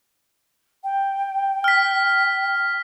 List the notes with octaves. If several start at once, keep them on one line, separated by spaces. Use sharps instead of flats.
G5
F6 B6